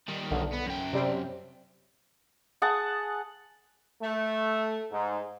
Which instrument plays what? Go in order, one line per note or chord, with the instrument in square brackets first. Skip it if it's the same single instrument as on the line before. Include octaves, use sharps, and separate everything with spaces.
[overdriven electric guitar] D#3 G3
[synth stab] B1 D3
[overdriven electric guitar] B3
F#2 G5
[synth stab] C3 G3 C4
[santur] G#4 F#5 A5 D#6
[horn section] A3
G#2